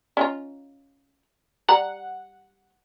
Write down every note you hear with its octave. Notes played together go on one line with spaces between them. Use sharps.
C#4 D#4 F4
G3 F#5 A#5